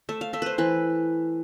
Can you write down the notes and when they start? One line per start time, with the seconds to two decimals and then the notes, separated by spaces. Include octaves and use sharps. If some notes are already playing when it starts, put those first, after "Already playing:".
0.09 A3 E5
0.21 F5
0.33 A3 E5
0.42 B4 C5
0.58 E3 B4